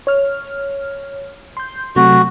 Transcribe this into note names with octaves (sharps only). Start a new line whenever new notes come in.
C#5 F6
C6 G6
C3 F#3 A3 F#4